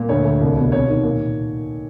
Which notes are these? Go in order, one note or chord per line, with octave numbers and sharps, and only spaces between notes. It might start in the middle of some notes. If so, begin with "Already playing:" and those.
Already playing: A#2
D2 C#5
D2
C2
B2
C3 C#5
D#3
A#2